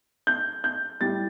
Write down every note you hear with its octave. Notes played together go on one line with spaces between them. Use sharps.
G6
G6
A2 G3 A6